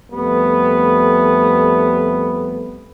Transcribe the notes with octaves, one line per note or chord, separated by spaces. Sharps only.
F2 G3 A3 B3